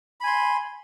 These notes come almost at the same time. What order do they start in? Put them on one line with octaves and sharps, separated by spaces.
B5 G#5 C6